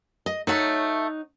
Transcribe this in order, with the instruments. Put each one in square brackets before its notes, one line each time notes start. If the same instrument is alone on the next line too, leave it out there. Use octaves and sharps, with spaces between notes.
[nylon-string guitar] D#5
[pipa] F#3 A3 [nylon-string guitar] D#4 C#5 F#5